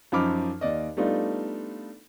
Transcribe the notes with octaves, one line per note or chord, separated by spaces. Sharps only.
F#2 F3 D#4 B5 D6 F6
D#2 D5 D#5
G3 A3 B3 D4 D#4 F4